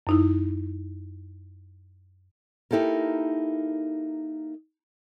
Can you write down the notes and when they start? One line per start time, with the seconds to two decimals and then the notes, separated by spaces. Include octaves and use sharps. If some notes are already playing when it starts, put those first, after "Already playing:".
0.07 F#2 D#4 E4
2.71 A#3 D#4 E4 G4 A4 A#4